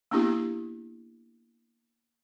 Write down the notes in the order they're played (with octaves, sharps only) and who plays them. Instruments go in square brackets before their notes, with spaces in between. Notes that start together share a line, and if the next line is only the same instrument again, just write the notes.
[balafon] A#3 B3 D4 E4 G4